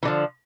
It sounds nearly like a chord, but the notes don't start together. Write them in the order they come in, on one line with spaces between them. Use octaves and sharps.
E3 D3 F3